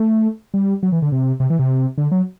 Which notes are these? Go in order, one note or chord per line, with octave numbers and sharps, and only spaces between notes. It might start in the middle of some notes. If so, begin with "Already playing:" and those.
Already playing: A3
G3
F#3
E3
D3
C3
C3
E3
C3
D3
F#3